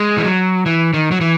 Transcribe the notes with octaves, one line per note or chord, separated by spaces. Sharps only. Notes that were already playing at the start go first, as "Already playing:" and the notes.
Already playing: G#3
E3
F#3
E3
D#3
F#3
E3